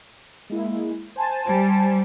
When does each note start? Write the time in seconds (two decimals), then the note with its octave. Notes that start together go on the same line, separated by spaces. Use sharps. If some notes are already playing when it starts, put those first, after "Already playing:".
0.50 G#3 A#3 E4
1.16 C5 G#5 A5
1.48 G3